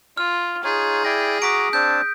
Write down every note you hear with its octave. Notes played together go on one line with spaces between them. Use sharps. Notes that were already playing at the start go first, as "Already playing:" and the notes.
F4 F6
D#4 F4 G#4 C#5
E4 D5 G5 A#6
F#4 A#5 D6 D#6 B6 D7
C4 D4 A5 G6